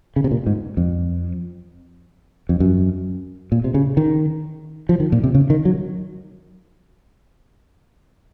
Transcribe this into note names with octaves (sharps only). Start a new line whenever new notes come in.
C#3
C3
A#2
G#2
F2
F2
F#2
A#2
C3
C#3
D#3
F3
D#3
A#2
C3
C#3
D#3
F#3